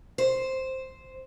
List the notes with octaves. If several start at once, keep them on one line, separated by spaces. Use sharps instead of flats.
C5